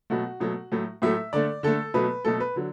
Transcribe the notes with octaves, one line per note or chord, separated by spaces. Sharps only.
B2 F#3 A3 F#4
B2 F#3 A3
A2 F#3 A3
A2 F#3 A3 E5
D3 A3 D5
D3 A3 A4
B2 F#3 A3 B4
B2 F#3 A3 A4
B4
D3 F#3